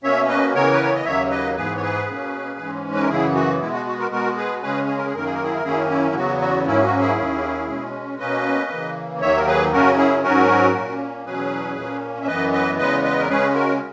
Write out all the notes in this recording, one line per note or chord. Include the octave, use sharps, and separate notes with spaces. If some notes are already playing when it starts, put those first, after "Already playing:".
B2 A#3 C#4 C#5 E5
B4 D#5
C#3 E3 B3 A#4 C#5
B4
C#5
D#5
D#2 C#3 F#3 A#3 C#5 E5
B4 D#5
G#2 E3 B3 G#4 B4
C#5
G#4 B4
B2 A#3 C#4
G#2 E3 G#3 C#4
B4
A#4
F#2 C#3 E3 B3 E4 G#4
F#4
B2 G#3 B3 E4
F#4
F#4
F#4 A#4
B2 G#3 B3 F#4 A#4
G#4 B4
C#3 G#3 C#4 G#4 B4
G#4
A#4
G#4
F#2 D#3 A#3 A#4
G#4
A#4
E4 G#4
A#4
F#2 D#3 A#3 C#4 E4 G#4
E4
E4
E2 C#3 F#3 B3 F#4
F#4
G#2 F#3 A#3 C#4 E4
F#4
E4 G#4
D#2 D#3 A#3 C#4
B2 G#3 C#4
B2 A#3 C#4 B4 D#5
C#3 E3 A#3
D#2 D#3 F#3 A#3 C#5 E5
A#4
G#4 B4
F#2 C#3 F#3 C#4 F#4 A#4
E4 G#4
G#2 F#3 C#4 F#4 A#4
A#2 A#3 C#4
E2 B2 F#3 C#4 G#4 B4
A#2 A#3 C#4
E5
F#2 E3 B3 B4 D#5
B4 D#5
E2 C#3 G#3 B3 B4 D#5
B4 D#5
A#4
C#3 G#3 C#4 G#4 B4
F#4 A#4